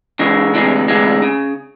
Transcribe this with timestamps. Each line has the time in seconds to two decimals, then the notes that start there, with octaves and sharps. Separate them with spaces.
0.19 C#3 E3 G#3
0.54 D2 C3 E3 G#3
0.88 D2 C3 E3 G#3
1.22 C#3